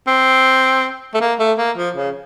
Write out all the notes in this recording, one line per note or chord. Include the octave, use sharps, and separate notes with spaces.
C4
A3
A#3
A3
A#3
F3
C#3